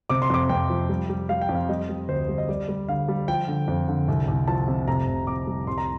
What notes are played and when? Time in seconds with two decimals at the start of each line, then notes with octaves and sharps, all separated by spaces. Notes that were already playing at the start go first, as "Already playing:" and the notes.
0.10 C3 D6
0.22 C6
0.30 F2 D6
0.49 F2 G5
0.70 F3
0.89 G3
1.10 G3
1.29 G3 F5
1.42 G5
1.49 F2
1.55 F5
1.69 G3 D#5
1.89 G3
2.09 D2 C5
2.29 G3
2.38 D#5
2.49 G3 D5
2.69 G3
2.88 D3 F5
3.08 G3
3.28 F3 G5
3.48 D3
3.68 F2
3.88 D3
4.08 C2
4.28 C2
4.48 F3 A5
4.68 C3
4.87 F1 A#5
5.08 F1
5.27 F1 D6
5.47 G3
5.67 C2 C6
5.78 A#5